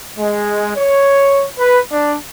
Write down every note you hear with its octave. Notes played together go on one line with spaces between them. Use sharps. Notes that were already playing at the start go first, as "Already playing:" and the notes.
G#3
C#5
B4
D4